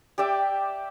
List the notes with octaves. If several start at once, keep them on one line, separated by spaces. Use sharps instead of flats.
G4 D5 E5 G5